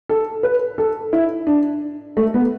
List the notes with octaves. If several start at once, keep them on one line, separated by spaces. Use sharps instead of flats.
A4
B4
A4
E4
D4
A3
B3